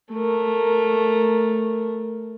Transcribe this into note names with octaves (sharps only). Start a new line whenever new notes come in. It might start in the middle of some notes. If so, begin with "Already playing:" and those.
A3 A#4